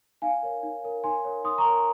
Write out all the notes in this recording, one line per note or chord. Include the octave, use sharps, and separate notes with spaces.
D#4 F5 G#5
A#4 C#5
D#4
A#4 C#5
D#4 G#5 C6
A#4 C#5
D#4 C6 D#6
A#5 C#6
A#4 C#5